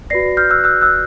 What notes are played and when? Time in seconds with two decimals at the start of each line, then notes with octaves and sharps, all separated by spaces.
0.10 F#4 B4 D5 A#6 C7
0.37 F6 G6
0.50 E6 F#6
0.64 E6 F#6
0.81 E6 F#6